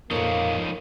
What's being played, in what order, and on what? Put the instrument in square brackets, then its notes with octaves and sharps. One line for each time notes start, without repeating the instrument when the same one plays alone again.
[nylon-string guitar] F2 A#2 [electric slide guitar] F3 D#4 C#5 [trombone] A#3